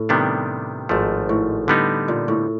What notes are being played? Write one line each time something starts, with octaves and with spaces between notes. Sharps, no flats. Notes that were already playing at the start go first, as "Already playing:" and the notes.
Already playing: A2
C3 D#3 G3 B3 D4
G#1 G#2 F3 A3
A2
D3 G3 B3 D#4
A#2
A2